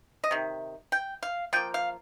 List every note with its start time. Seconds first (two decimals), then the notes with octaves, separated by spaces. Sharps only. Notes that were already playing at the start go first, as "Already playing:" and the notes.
0.24 D#5
0.31 C3 D#3
0.92 G5
1.23 F5
1.53 F3 A#3 G5
1.74 F5